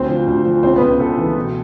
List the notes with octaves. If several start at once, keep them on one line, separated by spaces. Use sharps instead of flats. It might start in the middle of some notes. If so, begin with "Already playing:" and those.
Already playing: D2 C4 C5
F3
D2
F3
C#2 C4 C5
B3 B4
C#2
C#2 A4
E3
B2